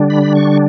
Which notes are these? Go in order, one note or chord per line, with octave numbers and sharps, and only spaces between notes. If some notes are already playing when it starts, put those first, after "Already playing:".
Already playing: D3 G3 D4
B5
C#6